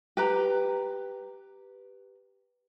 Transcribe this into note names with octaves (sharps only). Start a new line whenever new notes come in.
G4 B4 A#5